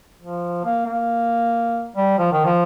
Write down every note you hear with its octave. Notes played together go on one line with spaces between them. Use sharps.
F3
A#3
A#3
G3
F3
D#3
F3